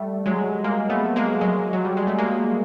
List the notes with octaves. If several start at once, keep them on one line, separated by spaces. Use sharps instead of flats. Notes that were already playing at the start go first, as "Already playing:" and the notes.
Already playing: G3 A3
F#3 G#3
G#3 A#3
A3 B3
G#3 A#3
F#3 G#3
F#3
G3
G#3
A3
G#3 A#3